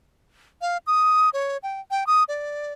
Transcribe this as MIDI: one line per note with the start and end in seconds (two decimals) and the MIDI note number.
0.61 0.78 77
0.87 1.30 87
1.33 1.57 73
1.63 1.81 79
1.91 2.07 79
2.07 2.24 87
2.29 2.73 74